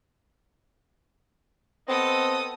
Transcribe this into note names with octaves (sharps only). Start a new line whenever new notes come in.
B3 C4 A4 D#5 D#6